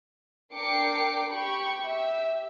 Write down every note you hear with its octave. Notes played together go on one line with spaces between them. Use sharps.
D4 A#4 G5 D6 C7 C#7
G4 G5 B5 C#6
G4 E5